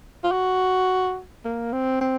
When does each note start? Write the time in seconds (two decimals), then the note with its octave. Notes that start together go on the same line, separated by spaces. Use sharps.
0.23 F4
0.32 F#4
1.45 A#3
1.73 C4
2.01 C4